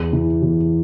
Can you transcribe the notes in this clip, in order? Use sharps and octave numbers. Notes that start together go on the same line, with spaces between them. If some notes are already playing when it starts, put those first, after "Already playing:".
Already playing: E2
E3
E2